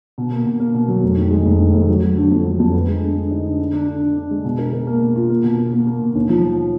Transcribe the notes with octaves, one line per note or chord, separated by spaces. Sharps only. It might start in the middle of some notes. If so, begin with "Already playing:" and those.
B2
A#3
B2
A#3
B2
F#3
F1
D#3
G#3
F1
D#3
F1
F#3
F#3
D3
F2
F#3
F2
B3
G#3
D3
D3
D#4
D3
D3
D4
D3
D3
D4
G#3
B2
A#4
A#4
A#3
B2
F4
A#3
B2
A#3
A#3
A#3
B2
D#2
F3
F3